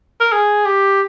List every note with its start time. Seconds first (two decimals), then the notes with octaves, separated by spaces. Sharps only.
0.21 A#4
0.32 G#4
0.66 G4